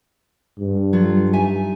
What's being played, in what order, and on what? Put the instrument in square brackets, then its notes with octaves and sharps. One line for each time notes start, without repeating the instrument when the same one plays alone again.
[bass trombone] G2
[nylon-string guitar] F#3 F4 A4
D#4 E5 G#5